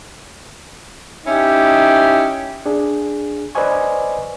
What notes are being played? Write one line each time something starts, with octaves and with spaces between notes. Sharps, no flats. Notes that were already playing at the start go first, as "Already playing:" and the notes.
C#4 D#4 E4 G4
D4 G#4
B4 C5 D5 D#5 G#5 C#6